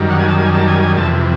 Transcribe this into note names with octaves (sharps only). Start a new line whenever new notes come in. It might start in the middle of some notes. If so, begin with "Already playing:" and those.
Already playing: F#2 D#3 G3
F#5
G#5
A5
G#5
A5
G#5
G#5
F2 C3 E3 A5